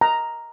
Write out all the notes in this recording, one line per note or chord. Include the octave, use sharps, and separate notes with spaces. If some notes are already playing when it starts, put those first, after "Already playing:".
A#5